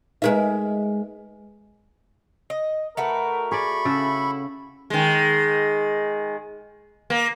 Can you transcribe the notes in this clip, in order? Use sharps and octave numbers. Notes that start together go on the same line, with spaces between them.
G#3 D#4 G#4 A#4 B4 E5
D#5
A3 F#4 A#4 B4
G#4 D5 B5 C#6
C#3 E4 A4
D#3 G#3
A#3